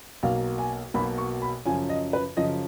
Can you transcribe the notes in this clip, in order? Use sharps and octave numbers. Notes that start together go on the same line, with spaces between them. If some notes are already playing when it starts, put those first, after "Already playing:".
B1 B2 A#3 F5
G#5
B1 B2 A#3 B5
C#6
B5
F#2 C#3 F3 G#5
D#5
B4
F#2 C#3 F3 D#5